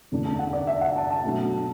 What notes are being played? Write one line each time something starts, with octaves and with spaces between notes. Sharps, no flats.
E2 D3 A3 D4
A5
F#5
D5
E5
F#5
A5
A5
B2 F#3 A3 D4